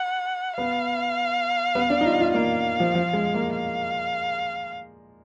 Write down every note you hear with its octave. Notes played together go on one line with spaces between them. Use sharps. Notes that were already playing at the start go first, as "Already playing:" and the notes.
Already playing: F#5
B3 F5
B3
D4
D#4
F4
F4
A#3 F5
F3
F3
G#3
A#3
F5